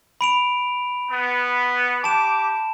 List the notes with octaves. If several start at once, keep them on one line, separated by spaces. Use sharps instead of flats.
B5 D7 F7
B3
G4 A5 D6 E7